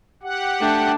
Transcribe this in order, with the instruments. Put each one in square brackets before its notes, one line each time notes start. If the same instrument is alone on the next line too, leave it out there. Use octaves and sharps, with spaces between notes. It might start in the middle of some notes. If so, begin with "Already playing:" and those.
[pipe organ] G4 F#5
[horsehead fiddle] A3 G5 [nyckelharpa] D4